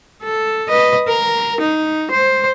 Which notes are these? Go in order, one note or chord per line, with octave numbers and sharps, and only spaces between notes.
A4
B4 D#5
A#4
D#4
C5